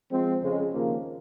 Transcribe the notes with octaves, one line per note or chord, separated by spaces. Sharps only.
F3 G#3 C4
F2 C#3 G#3
D#2 C#3 F3 A#3